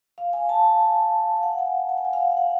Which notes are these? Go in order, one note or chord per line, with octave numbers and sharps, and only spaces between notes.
F5
G#5
A5
G#5
G#5
F5
F#5
G#5
G#5
F#5
G#5
F5
F#5
F#5